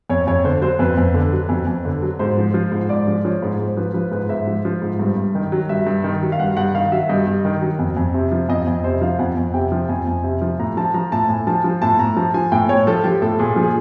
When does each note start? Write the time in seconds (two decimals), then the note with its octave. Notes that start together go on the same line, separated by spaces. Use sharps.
0.10 F2 C#5
0.27 F2 C#5
0.44 D3 C5
0.61 F#3 C5
0.79 F2 B4
0.98 F2
1.14 D3
1.32 F#3
1.49 F2
1.67 F2
1.85 D3
2.02 F#3
2.19 G#2 C5
2.37 F3
2.54 F3
2.72 G#2
2.89 G#2 D5
3.07 F3
3.25 F3 C#5
3.42 G#2
3.59 G#2 C5
3.77 F3 B4
3.94 F3 B4
4.11 G#2 B4
4.29 G#2 E5
4.47 F3
4.65 F3
4.82 G#2
5.00 G2
5.16 G2
5.35 D#3
5.52 F#3
5.69 G2 E5
5.87 G2
6.04 D#3
6.22 F#3
6.32 F5
6.39 G2 F#5
6.57 G2 F#5
6.74 D#3 F5
6.92 F#3 E5
7.09 G2 D#5
7.27 G2
7.45 D#3
7.62 F#3
7.79 F2
7.97 F2
8.14 C3
8.32 F3
8.49 F2 D#5
8.67 F2 D#5
8.84 C3 C5
9.01 F3 F5
9.19 F2 F#5
9.37 F2
9.54 C3 G5
9.72 F3
9.89 F2 G#5
10.07 F2
10.24 C3
10.42 F3
10.59 A2 A#5
10.77 F3 A5
10.94 F3 A#5
11.12 A2 A5
11.29 A2 G#5
11.47 F3 A5
11.64 F3
11.82 A2 A5
11.99 A2 A#5
12.17 F3 A5
12.34 F3 G#5
12.52 A2 G5
12.69 A2 C#5
12.87 F3 A4
13.04 F3 G4
13.22 A2 A4
13.39 A#2 G#4
13.56 F3
13.63 G#4